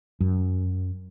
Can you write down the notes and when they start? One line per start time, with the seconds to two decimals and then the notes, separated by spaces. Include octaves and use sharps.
0.21 F#2